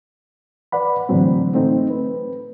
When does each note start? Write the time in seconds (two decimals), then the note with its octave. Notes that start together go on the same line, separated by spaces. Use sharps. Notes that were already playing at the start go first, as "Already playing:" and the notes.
0.72 B4 D5 F#5 B5
1.09 A2 D3 E3 F#3 C4
1.54 A3 C4 D#4
1.90 B4